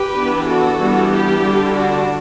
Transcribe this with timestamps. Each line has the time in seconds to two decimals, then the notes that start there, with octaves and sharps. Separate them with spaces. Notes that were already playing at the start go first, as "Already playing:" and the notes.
Already playing: G4 B4
0.15 E3 B3 D4
0.47 F#4 A4
0.79 E3 G3 B3 D4
1.10 E4 G4
1.42 D3 G3 D4
1.73 D4 F#4